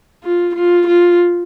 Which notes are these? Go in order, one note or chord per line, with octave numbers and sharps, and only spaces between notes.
F4
F4
F4